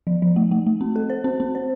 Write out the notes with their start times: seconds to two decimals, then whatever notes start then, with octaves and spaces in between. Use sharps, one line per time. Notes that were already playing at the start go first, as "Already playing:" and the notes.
0.07 F3
0.22 F3
0.36 A3
0.51 A3
0.67 A3
0.81 C4
0.96 A4
1.10 C5
1.24 C4
1.40 C4
1.55 C5